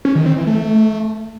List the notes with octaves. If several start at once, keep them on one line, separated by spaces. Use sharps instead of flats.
C#4
D#3
C4
E3
A3